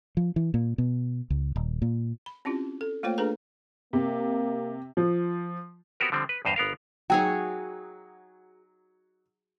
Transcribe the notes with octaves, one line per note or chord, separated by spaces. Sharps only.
F3
E3
A#2
B2
C#2
D#1
A#2
B5
C4 C#4 E4 F4 G4
A4
A3 A#3 F4 C5 C#5 G5
A3 D4 G#4 A4 B4 A#5
C3 A#3
F3
B3 C4 F#4 G4 A#4
D3 F3 G3 C4
B4
E2 G2 C5 D#5 F5
G1 B3 A#4 F5
F#3 D#4 F#4 G#4 C#5 G5 E6